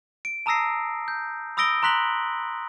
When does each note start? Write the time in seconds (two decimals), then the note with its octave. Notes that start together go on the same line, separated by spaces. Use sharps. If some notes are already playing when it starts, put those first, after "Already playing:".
0.25 D7
0.46 A5 A#5 D#6 E6 A#6 C7
1.08 G6
1.57 B5 D#6 E6 A#6 D7 G7
1.83 A#5 C6 F#6 B6 F#7 G7